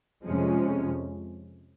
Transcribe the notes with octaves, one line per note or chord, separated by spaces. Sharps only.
F2 C3 F3 G#3 C#4